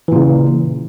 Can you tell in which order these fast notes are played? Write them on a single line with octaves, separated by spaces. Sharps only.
E3 A#2 C#3